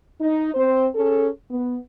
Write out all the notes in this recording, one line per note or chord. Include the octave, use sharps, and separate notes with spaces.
D#4
C4 C5
C#4 G#4 A4
B3